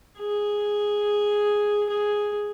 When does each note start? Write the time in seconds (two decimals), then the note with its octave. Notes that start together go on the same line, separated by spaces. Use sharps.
0.19 G#4
1.90 G#4